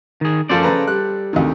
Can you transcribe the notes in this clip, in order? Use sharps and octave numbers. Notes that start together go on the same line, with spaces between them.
D#3 G#4
F#2 F3 A4 C5 D5
C#3 B4 A#5
G3 F#6
D2 C3 D#3